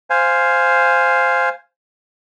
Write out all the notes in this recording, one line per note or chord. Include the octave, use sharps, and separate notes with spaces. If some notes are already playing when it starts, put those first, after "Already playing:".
C5 F5 G#5